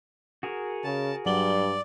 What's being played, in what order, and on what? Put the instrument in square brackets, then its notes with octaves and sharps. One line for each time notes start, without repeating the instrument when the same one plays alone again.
[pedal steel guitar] F#4 G#4 A#4
[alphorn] C#3 [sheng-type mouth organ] A5
[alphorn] G2 [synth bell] F#3 F#7 G7 [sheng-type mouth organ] D5